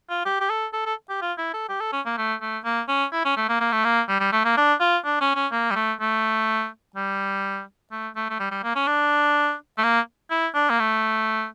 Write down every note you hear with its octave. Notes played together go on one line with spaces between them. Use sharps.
F4
G4
G4
A4
A4
A4
G4
F4
E4
A4
G4
A4
C#4
A#3
A3
A3
A#3
C#4
E4
C#4
A3
A#3
A#3
A3
A#3
G3
G3
A3
A#3
D4
F4
D4
C#4
C#4
A#3
G3
A3
A3
G3
A3
A3
A3
G3
G3
A#3
C#4
D4
A3
A#3
E4
D4
A#3
A3